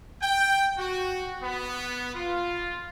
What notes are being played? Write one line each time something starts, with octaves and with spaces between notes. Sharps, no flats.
G5
F#4
B3
F4